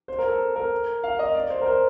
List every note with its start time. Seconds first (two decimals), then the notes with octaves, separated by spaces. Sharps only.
0.08 C5
0.19 A#4
0.29 A4
0.56 A#4
1.04 F5
1.19 D#5
1.35 D5
1.50 C5
1.62 A#4
1.66 C5